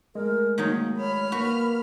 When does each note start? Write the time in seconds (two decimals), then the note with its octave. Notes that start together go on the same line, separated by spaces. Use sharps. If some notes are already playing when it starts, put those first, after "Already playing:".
0.15 G#3 A3 A#4
0.58 D#3 F#3 A#3 D#4
0.98 C#5 B5 F6
1.32 A#3 F#4 B4